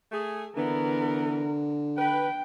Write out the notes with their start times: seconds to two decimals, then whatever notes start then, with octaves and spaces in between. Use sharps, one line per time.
0.12 A3 G#4
0.57 D3 E3 B3 A#4
1.98 B4 G5